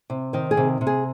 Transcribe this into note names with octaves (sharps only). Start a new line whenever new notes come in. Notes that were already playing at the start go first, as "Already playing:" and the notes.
C3
D#3 C5
G#4
C3
C3
G#4